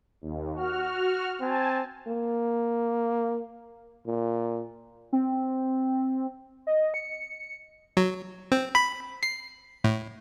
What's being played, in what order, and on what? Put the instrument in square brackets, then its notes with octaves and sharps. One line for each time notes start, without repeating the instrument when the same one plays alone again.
[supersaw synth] D#2
F#4 F6
[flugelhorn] C4 [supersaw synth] G#5 A5
[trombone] A#3
A#2
[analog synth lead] C4
D#5
C#7
[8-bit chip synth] F#3
C4
B5
C7
A2